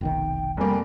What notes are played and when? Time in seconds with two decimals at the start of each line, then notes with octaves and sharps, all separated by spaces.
0.01 F1 B1 D#3 G5
0.57 F1 G3 A#3 G#5